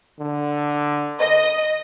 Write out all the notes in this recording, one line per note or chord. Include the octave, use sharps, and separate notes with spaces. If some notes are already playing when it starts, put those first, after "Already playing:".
D3
D#5